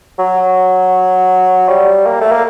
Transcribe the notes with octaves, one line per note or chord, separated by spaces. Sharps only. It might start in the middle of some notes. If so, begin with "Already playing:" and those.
F#3
G3
A#3
A3
A#3